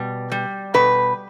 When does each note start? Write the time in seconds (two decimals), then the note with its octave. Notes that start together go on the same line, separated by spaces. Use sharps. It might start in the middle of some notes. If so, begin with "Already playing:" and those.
Already playing: B2 G3
0.32 G3
0.74 B2 B4